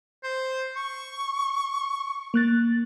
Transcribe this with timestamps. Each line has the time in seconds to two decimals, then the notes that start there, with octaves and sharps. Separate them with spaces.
0.23 C5
0.76 C#6
2.34 A#3 F#6 A6